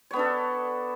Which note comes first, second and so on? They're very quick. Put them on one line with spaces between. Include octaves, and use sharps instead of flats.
C#5 B3 D4 A4